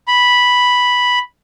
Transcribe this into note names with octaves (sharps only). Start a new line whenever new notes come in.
B5